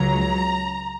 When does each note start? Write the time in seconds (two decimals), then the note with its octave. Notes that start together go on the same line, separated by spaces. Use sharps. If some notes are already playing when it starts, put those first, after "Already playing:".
Already playing: C#2 C#3 F#3 A#5